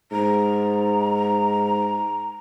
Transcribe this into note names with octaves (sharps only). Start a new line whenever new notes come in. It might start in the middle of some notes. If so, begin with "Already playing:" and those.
G#2 A#5